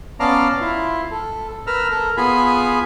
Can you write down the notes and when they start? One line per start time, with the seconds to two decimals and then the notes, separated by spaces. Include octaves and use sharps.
0.20 B3 C#4 D5 F5 A5 A#5
0.61 E4 F4
1.11 A4
1.67 A#4 B4 A#5 E6 F6
1.90 A4 A#4
2.17 B3 F4 G#4 G#5 B5